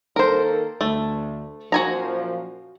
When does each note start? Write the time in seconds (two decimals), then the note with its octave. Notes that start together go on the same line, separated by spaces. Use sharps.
0.16 D#3 A#3 A4 A#4 C5
0.81 D2 A3
1.72 F#2 A#2 F3 F#4 G#5 A#5